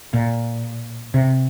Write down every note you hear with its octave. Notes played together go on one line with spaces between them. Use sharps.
A#2
C3